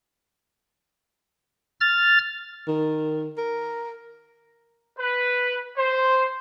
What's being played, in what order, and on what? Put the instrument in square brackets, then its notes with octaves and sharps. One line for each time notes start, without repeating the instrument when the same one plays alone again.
[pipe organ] F6 A6
[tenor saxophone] D#3
A#4
[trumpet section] B4
C5